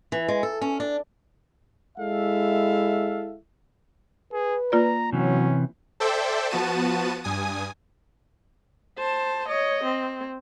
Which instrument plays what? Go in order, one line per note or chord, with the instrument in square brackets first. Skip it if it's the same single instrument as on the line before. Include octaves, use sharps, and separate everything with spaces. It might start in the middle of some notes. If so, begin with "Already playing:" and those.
[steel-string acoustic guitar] E3
G#3
A4
C#4
D4
[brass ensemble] G#3 E4 A4 E5 F5
[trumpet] G#4 [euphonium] B4
[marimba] A#3 F4 D5 [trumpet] A#5
[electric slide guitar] C3 E3 [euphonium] F#3 [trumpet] C#4
[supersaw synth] A4 C5 D5 E5 G5
F3 B3 F#4 A5 D#7
G2 G#5 D#6
[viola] C5 A5
C#5 D#5
C4